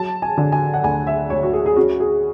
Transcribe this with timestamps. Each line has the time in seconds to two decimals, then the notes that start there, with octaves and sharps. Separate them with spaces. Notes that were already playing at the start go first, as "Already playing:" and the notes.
Already playing: F#3 A5
0.22 G#5
0.37 D3
0.52 G#5
0.74 F#5
0.83 D2 G#5
1.07 E5
1.30 D2 C#5
1.43 F#4
1.53 G#4
1.66 G#4
1.76 C#4 F#4
2.00 G#4